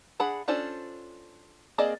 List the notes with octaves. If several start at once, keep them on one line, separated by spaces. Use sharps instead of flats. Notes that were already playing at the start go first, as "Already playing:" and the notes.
D4 G#4 F#5 B5
C#4 D4 F4 A4 C5
A#3 C4 G#4 D5 D#5